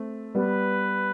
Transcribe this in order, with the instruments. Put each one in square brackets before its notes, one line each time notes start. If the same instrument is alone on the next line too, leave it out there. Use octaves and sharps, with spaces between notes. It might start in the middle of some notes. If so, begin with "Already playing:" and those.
Already playing: [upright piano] A3 C4
[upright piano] G3 B3 [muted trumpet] B4